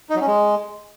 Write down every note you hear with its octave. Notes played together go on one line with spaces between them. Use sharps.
D#4
F#3
C#4
G#3